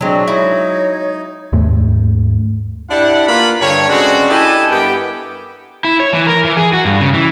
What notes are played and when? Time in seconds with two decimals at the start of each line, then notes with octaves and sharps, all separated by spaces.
0.01 F#3 G#3 C4 D4
0.27 D#4 E4 C#5
1.53 D#2 G#2 A3
2.90 D4 E4 G4 D5 F#5
3.27 A#3 F4 B4 F5 B5
3.60 G2 D3 C#5
3.89 C#3 G#3 C4 D4 F#4
4.30 E4 G4 A4 D#5 G#5 A5
4.70 G2 B3 G4 A#4 F#5 G5
5.85 E4
6.00 C#5
6.13 E3
6.27 A#4
6.45 E3
6.57 G#4
6.73 F#4
6.85 G2
7.00 C#3
7.14 E3